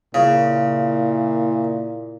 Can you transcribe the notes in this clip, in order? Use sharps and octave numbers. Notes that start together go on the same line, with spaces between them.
A#2 C#3 E4